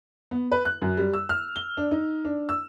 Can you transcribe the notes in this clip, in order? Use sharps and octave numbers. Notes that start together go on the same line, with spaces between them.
B3
B4
F#6
F#2
G3
E6
F6
G7
D4
D#4
D4
E6